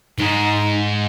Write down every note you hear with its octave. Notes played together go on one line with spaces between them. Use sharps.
G#2 D#4 G#4